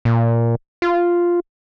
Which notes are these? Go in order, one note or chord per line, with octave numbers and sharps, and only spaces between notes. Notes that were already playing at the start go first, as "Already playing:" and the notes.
A#2
F4